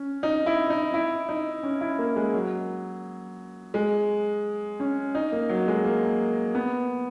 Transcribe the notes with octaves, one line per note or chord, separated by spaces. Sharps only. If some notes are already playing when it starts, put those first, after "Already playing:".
Already playing: C#4
D#4
E4
D#4
E4
D#4
C#4
E4
A#3
G#3
F#3
G#3
C#4
D#4
A#3
F#3
G#3
A#3
B3